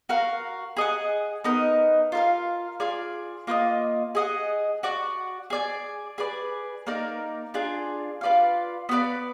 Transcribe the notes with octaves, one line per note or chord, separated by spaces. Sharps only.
F#4 A#4 F5
G#4 D#5 F#5
B3 D#4 A#4 D#5
F4 A#4 F5
F4 G#4 D5
A#3 F4 B4 D#5
G#4 D#5 F#5
F#4 D5 F#5
G#4 D5 G#5
G#4 B4 D5
A#3 D#4 A#4 D5
D4 F4 G#4 D5
F4 B4 D5 F5
B3 F4 B4 D5